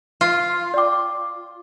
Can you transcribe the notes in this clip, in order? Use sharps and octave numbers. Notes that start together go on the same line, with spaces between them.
F4
D5 G5 D6